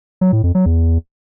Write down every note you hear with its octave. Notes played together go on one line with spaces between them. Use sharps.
F#3
A2
F2
F#3
E2